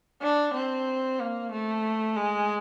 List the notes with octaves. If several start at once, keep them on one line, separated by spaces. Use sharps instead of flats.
D4
C4
A#3
A3
G#3